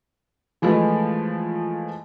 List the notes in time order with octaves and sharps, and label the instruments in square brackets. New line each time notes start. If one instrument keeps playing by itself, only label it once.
[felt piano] E3 F3 G#3 A3